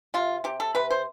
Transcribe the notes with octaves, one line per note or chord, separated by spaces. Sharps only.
C3 F4
C3 G4
A4
C3 B4
C5